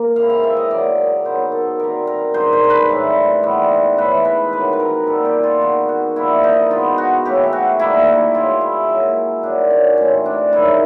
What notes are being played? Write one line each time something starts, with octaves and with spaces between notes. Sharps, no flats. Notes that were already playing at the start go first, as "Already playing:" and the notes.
Already playing: A#3
C3 E3 G#3 C4 F5
F5
E5
D#5
F#2 C#3 F#3 D5
D#3 F#3 B3 C5
A4
B2 G3 C4 A#4
A#4
G2 D#3 G#3 C5
C5
A#4
B4
A2 E3 G3
G#2 E3 G3 B3
G#2 E3 A3 C#4 B4
B4
C3 D#3 F#3 B4
B4
A#4
A#2 G3 B3 A4
G4
F4
D#3 G#3 B3 F#4
F#4
G2 D3 F3 A#3 E4
D#4
B2 G#3 B3 F4
F#4
C#3 E3 A3 C#4 G4
F#4
D#3 G3 A#3 E4
B2 G#3 C#4 F4
E4
A#2 F#3 A#3 C#4
G2 D#3 F#3 D4
C#4
A2 E3 A3 C4 C#4
D4
G#2 D#3 G#3 C#4 E4